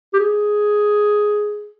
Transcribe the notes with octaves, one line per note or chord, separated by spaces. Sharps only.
G4
G#4